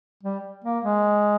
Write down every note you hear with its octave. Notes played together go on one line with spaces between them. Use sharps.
G3
A#3
G#3